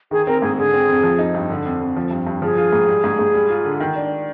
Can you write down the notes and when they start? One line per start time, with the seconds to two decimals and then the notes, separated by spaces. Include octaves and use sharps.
0.11 D#3 G#4
0.27 C4 A#4
0.42 G#2 G#4
0.57 D3 G#4
0.74 C4
0.89 F2
1.03 F3
1.19 D#4
1.34 G2
1.50 D3
1.65 F2
1.81 F2
1.96 F3
2.11 G2
2.27 G2
2.42 F3 G#4
2.58 F4
2.73 G#2
2.88 G3
3.04 G#2
3.19 G#2
3.34 G3
3.50 F4
3.65 D3
3.80 D#3
3.96 D4